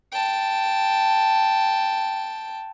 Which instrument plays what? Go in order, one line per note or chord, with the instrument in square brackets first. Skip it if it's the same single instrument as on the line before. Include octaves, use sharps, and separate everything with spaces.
[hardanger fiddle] G5 A5